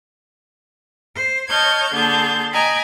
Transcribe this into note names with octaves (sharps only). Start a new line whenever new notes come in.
C5
C#5 D#5 A5 F6 G6 G#6
D3 A#3 G#4 A5 G6
D#5 G5 G#5 A#5 B5